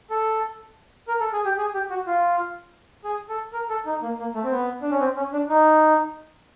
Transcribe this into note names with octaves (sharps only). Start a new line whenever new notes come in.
A4
A#4
A4
G#4
G4
G#4
G4
F#4
F4
G#4
A4
A#4
A4
D#4
A#3
A#3
A3
C4
B3
D4
C#4
C4
C#4
D4
D#4